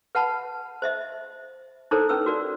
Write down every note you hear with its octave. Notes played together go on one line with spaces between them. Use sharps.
B4 F#5 A5 B5
C5 D#5 E5
D#4 E4 A4 A#4 C5 C#5
C#4 B4 E6
F#4 A#4 D5